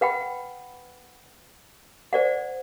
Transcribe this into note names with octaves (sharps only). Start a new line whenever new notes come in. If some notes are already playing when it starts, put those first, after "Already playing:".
B4 F#5 G5 B5
C5 D5 F#5